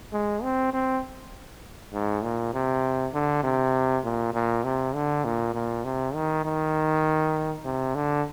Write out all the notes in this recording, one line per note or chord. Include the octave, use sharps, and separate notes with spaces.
G#3
C4
C4
G#2
A#2
C3
D3
C3
A#2
A#2
C3
D3
A#2
A#2
C3
D#3
D#3
C3
D3